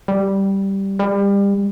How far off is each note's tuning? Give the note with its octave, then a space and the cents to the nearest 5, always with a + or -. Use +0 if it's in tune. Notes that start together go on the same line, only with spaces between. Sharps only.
G3 -5
G3 +30